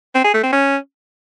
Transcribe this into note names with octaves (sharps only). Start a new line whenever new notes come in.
C4
G#4
A3
C4
C#4